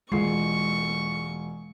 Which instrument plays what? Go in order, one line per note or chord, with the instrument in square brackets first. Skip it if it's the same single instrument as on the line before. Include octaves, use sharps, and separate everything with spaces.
[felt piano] E1 F4 C7 [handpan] G#3 [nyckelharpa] C#6